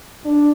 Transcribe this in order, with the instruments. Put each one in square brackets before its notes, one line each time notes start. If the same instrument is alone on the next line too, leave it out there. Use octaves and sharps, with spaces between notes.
[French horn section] D4